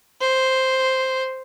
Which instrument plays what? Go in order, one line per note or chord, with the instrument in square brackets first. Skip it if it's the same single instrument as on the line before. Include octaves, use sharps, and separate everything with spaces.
[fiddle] C5